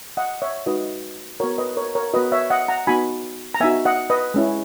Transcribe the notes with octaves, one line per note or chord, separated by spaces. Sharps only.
D#5 F#5
C#5 E5
G#3 D#4 F#4 B4 D#5
B3 F#4 A#4 C#5
B4 D#5
A#4 C#5
A#4 C#5
B3 F#4 B4 D#5
C#5 E5
D#5 F#5
F#5 A#5
B3 D#4 F#4 G#5 B5
A#5
B3 D#4 F#4 E5 G#5
D#5 F#5
B4 D#5
G#3 C#4 E4